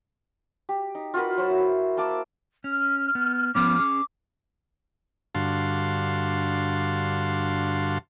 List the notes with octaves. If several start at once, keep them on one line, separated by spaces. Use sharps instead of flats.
G4
D#4
F4 F#4 A#4 B4
F#3 C5
E4
A#3 A5 D6 E6
C#4 F6
B3
F3 B3 C#4 D6
C#4 G#4
G2 D3 F#4 F5 A5 C6